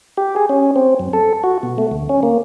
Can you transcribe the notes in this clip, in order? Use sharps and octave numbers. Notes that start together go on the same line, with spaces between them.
G4
G#4
C#4
C4
F#2
A4
F#4
B2
A3
D2
C#4
A#3